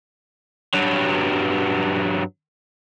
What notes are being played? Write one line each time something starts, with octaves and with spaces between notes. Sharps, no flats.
G2 F#3